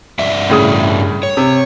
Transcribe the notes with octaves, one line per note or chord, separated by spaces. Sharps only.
G2 D5 E5
A2 C#3 D#6
C#5
C3